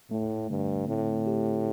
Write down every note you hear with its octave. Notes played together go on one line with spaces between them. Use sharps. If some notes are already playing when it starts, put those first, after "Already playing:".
A2 A3
G2 D3
A2 C4
G4